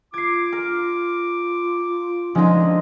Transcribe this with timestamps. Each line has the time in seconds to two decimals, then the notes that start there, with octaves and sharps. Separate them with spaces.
0.14 F4 D6 G#6 C7
0.53 A#4
2.35 D3 F3 G#3 C#4 D#4